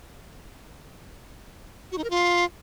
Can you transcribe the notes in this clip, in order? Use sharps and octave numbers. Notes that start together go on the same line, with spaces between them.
F#4
D#4
A#4
F4